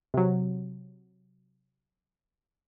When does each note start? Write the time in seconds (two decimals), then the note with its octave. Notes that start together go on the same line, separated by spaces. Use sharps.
0.14 C3 F#3